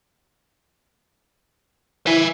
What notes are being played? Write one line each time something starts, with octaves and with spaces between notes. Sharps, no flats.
E4 E5 G#5